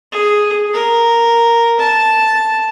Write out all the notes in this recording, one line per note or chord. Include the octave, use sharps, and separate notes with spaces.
G#4
A#4
A5